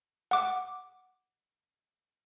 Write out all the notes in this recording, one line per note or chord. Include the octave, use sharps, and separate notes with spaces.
F#5 D6